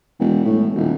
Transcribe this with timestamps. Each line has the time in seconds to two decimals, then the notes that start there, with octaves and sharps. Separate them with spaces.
0.19 E1
0.45 A2
0.75 D#1